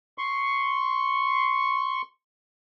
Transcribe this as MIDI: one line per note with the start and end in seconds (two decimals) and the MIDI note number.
0.18 2.02 84
0.18 2.02 85